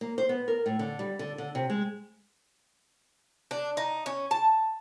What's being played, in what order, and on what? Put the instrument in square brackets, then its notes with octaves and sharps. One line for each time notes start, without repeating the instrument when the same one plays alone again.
[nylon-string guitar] A#3
C5
B3
A#4
A2
D3
G3
D3
D3
C3
G#3
[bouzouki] D4
D#4
C#4
A5